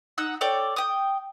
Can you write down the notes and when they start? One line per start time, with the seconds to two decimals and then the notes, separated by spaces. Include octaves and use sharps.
0.18 D#4 F#5 E6
0.41 A4 C#5 D5 G5
0.76 G5 D#6